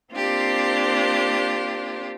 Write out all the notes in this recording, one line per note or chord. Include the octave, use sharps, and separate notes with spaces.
A#3 C4 D4 F4 G4